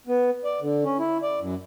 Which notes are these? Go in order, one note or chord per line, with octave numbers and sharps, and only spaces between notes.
B3
D5
D3
C#4
E4
D5
F#2